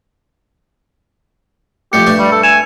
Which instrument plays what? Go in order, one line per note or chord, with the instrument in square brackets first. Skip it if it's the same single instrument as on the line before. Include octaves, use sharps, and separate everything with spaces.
[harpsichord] F2 G3 A3 [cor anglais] G4 [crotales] C#7
[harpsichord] G2 A3 C#6
[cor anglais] G3
A4
[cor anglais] G#5 [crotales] E7 F7